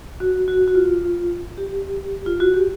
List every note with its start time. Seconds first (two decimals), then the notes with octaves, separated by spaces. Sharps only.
0.20 F#4
0.48 F#4
0.68 F#4
0.75 F4
1.58 G4
2.26 F4
2.40 F#4
2.54 G4